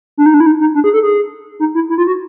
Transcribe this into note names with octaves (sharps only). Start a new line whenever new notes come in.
D4
D#4
D4
E4
D#4
D#4
D4
G#4
A4
G#4
D#4
E4
E4
F4
F#4